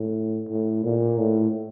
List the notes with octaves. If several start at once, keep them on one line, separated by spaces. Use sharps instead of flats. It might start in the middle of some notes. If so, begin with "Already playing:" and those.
Already playing: A2
A2
A#2
A2